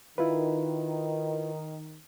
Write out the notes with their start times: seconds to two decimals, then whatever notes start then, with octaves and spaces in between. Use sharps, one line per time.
0.18 D#3 E4 F4 B4